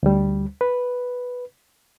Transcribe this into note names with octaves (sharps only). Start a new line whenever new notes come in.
D2 G3
B4